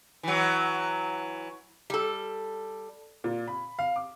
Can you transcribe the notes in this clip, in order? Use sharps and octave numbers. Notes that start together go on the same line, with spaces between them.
E3 F#3
G3 A4
A#2
B5
F5
D6